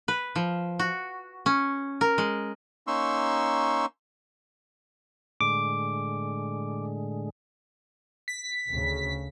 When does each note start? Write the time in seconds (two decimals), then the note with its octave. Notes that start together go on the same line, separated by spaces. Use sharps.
0.08 B4
0.36 F3
0.79 F#4
1.46 C#4
2.01 A#4
2.18 G#3
2.87 A#3 C#4 D#4 C6 C#6 E6
5.41 A2 D3 G#3 D6
8.28 B6
8.68 D2 C#3